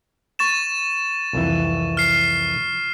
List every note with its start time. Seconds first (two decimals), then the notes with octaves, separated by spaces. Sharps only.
0.39 C#6 A6 E7
1.33 C2 F2 E3
1.97 F6 C7